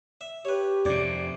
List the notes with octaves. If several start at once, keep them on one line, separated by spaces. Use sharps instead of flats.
E5
G4 B4 C#5
F2 C3 D5